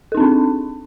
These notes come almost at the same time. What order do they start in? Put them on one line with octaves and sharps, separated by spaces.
A4 D#4 C4 D4